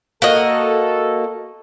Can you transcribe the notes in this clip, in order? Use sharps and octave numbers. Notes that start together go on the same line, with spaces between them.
A#3 F#4 A4 D#5